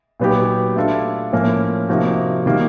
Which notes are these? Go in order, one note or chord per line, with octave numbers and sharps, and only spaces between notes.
A#2 F#3 B3 D#4 G4
A3 D4 F4 A4
A2 F3 A#3 C#4
C3 F3 A#3 D#4 F#4
D#3 G3 A#3